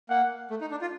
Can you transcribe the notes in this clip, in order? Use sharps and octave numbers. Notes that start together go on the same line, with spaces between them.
A#3 F#5
A3
D#4
D4
F4